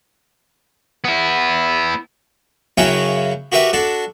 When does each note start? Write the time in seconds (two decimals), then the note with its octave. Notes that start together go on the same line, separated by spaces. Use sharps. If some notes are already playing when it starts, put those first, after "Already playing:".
1.05 B3 E4
2.78 F#2 C#3 C#4 E4 F#4 G5
3.52 F#4 G4 A#4 B4 E5 F#5
3.73 D4 F#4 A4